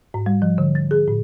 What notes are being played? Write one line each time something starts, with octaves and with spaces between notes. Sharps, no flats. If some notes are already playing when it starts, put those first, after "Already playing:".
G#2
G3
F3
D3
A6
G#4
A2